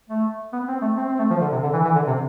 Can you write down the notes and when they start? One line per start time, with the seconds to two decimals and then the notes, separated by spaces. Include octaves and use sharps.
0.09 A3
0.53 B3
0.68 C4
0.82 A3
0.98 C4
1.08 C4
1.19 A3
1.30 F3
1.41 D3
1.52 C3
1.63 D3
1.73 E3
1.84 E3
1.95 D3
2.07 C3